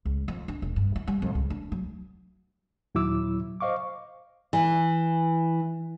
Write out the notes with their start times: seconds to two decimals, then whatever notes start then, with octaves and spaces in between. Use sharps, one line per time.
0.05 C#2
0.28 F2
0.48 D4
0.62 E1
0.76 G2
0.96 E4
1.07 G3
1.22 F2
1.35 C#2
1.50 D4
1.72 F#3
2.95 D#2 A#2 F#3 E4 D6 E6
3.60 C5 D#5 F5 C#6 D6
4.53 E3